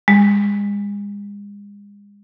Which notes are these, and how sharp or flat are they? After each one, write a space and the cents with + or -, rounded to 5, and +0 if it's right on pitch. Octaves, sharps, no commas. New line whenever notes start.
G#3 -40